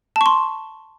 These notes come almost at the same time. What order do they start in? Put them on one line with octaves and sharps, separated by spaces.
A5 C#6 C6